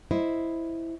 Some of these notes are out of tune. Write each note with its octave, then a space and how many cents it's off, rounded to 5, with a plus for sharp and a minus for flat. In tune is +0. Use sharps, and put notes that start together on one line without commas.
E4 +0 C5 +0 D#5 +0